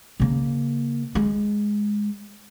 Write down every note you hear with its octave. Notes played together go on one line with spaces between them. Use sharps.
C#3 A#3
G#3